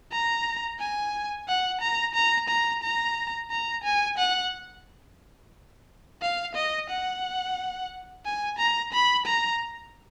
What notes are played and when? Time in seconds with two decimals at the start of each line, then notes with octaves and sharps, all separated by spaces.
0.12 A#5
0.79 G#5
1.48 F#5
1.81 A#5
2.14 A#5
2.49 A#5
2.83 A#5
3.51 A#5
3.84 G#5
4.18 F#5
6.22 F5
6.55 D#5
6.90 F#5
8.25 G#5
8.58 A#5
8.93 B5
9.26 A#5